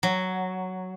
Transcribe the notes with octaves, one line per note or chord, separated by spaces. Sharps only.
F#3